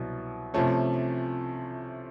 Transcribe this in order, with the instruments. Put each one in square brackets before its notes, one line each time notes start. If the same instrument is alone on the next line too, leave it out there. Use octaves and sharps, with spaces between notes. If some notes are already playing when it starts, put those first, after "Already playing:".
Already playing: [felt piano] C2 B2 F#3
C3 F3 A3 C#4